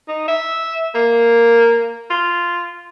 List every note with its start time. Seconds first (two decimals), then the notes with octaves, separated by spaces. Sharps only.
0.08 D#4
0.28 E5
0.95 A#3
2.10 F4